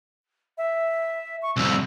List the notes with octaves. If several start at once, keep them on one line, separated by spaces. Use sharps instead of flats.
E5
C#6
C2 F2 E6